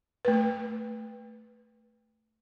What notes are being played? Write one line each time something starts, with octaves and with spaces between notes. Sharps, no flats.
A3 B4